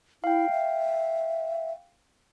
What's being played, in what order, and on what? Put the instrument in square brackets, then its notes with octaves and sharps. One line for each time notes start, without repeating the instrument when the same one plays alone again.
[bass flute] E4 [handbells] F5 G5
[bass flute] E5